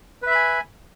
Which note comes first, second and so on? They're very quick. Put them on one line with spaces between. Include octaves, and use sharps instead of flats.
B4 E5 B5 G#5